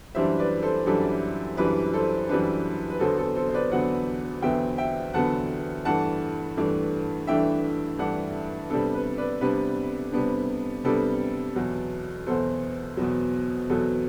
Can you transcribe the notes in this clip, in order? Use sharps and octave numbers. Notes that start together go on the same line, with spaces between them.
F#2 E3 G3 D4 C5 E5
B4 D5
A4 C5
F#2 E3 G3 D4 A4
F#2 E3 G3 D4 B4
A4 C5
F#2 E3 G3 D4 B4
B4
E2 D3 F#3 B3 A4 C5
A4
A4 C5
C5
B4 D5
E2 D3 F#3 B3 D5 F#5
E2 D3 F#3 B3 E5 G5
E5 G5
E2 D3 F#3 B3 F#5 A5
G2 E3 A3 D4 F#5 A5
G2 E3 A3 D4
G2 E3 A3 D4 E5 G5
G2 E3 A3 D4 D5 F#5
C3 G3 B3 D4 A4
B4
B4 D5
C3 G3 B3 D4 B4
C3 G3 B3 D4
C3 G3 B3 D4 A4
E2 B2 F#3
E2 B2 F#3 A4 C5
E2 B2 F#3
E2 B2 F#3 A4